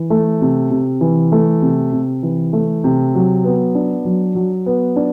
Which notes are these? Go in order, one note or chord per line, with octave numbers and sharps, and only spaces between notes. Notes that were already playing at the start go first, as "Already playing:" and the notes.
Already playing: E3
A3
C3
C3
E3
A3
C3
C3
E3
A3
C3
F#3
B3
D4
F#3
F#3
B3
D4